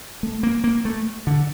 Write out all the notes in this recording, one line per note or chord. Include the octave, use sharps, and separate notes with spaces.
A3
A#3
A#3
A3
D3